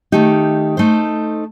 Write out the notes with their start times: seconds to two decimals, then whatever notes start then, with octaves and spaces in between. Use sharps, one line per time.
0.12 D#3 A3 D#4 G4
0.77 A3 D#4 A4 C5